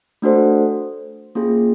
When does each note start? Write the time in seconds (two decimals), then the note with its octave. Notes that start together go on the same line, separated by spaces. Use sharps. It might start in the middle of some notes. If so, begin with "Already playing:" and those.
0.22 A3 D4 F#4 A4 C5
1.35 A#3 C#4 F4 G#4